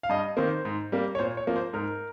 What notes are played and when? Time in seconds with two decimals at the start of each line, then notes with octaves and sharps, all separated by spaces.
0.03 F5
0.09 G2 D#5
0.37 D#3 A#3 C5
0.65 G#2
0.92 G3 A#3
1.15 C#5
1.19 A#2 C5
1.37 C#5
1.47 F3 A#3
1.56 C5
1.73 G#2 A#4